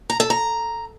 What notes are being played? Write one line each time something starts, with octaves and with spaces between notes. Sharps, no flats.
A#5
A4
A#5